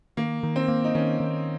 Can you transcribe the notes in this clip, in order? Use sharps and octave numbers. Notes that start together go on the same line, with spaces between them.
D#3 A#3
D#3
C4
A#3
D#4
D#3 C#4
D#3